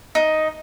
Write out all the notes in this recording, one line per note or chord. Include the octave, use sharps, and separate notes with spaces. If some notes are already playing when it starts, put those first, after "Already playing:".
D#4